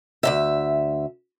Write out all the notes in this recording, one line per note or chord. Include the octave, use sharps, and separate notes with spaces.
D2 C3 E5